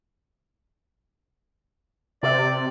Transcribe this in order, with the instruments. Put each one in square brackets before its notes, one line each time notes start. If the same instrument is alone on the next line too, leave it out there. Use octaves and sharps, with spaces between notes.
[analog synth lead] C3 [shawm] D5